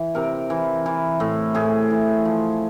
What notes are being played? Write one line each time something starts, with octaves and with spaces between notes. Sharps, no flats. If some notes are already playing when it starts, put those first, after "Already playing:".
Already playing: E3
C3 A#4
E3
E3
A2
A2 G#4
E3
F3